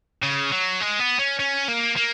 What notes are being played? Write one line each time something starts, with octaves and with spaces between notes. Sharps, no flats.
C#3
F#3
G#3
B3
C#4
C#4
A#3
A#3